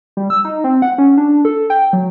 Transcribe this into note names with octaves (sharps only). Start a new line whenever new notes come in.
G3
E6
D#4
C4
F#5
C#4
D4
A4
G5
F#3